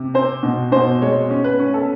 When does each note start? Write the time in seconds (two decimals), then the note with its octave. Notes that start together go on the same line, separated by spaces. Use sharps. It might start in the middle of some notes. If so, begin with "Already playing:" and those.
Already playing: C3
0.14 C4 C5
0.43 B2
0.72 B2 C5
1.01 G#3 C#5
1.30 C#4
1.44 B4
1.59 C#4
1.74 A4